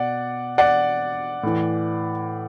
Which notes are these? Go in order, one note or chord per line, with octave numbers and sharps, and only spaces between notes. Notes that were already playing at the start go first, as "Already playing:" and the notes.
Already playing: B2 D5 F#5
D5 F#5
A2 E3